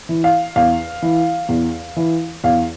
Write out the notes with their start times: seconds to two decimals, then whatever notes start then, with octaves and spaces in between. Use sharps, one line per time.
0.09 E3
0.24 F5
0.56 E2 F5
1.02 E3
1.49 E2
1.97 E3
2.44 E2 F5